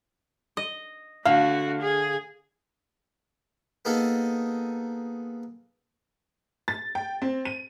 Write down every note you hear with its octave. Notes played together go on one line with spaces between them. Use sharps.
D#5
D3 A3 F#4 F5
G#4
A#3 B3 D#4 G#4 A4
A6
G5
C4
D#7